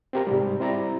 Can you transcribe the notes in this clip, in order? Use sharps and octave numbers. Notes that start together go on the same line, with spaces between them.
C4 G4 A#4
G#2 C3 G3
C4 E4 D5 A#5